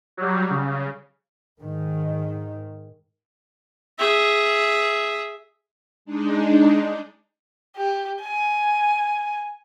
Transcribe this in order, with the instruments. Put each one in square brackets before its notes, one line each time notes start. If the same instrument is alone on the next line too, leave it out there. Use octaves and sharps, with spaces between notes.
[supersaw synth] F#3 G3
C#3
[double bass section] G#2 D#3
[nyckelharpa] G#4 E5
[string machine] G#3 D4 D#4
[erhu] G4
G#5